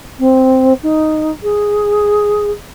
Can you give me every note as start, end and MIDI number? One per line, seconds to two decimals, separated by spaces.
0.19 0.73 60
0.82 1.30 63
1.42 2.50 68